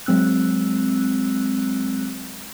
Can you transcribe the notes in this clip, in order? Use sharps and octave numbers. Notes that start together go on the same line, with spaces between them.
F#3 G#3 C4 E6 F#6